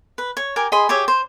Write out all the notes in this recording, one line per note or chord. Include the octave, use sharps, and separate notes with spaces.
B4
C#5
G4 A#4 G#5
G#4 D#5 B5 C6
G4 G#4 C#5 E5
C5